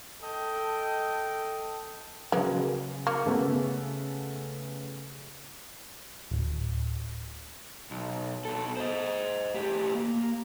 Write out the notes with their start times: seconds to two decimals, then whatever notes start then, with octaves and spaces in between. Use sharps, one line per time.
0.23 A4 D#5 G5
2.32 C#3 F#3 G#3 A#3 B3
3.07 A#3 C#6
3.26 C#3 A3 B3
6.31 D1
7.91 B1
8.45 B2 A4
8.77 C5 D#5
9.54 A2 G4
9.95 A#3